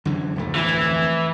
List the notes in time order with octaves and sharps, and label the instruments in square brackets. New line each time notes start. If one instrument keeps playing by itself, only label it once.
[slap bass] F#2 D3 E3
D1 F2 A3
[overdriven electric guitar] E3